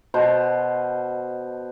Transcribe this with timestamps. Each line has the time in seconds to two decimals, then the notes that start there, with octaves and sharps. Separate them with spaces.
0.14 B2 C5 A5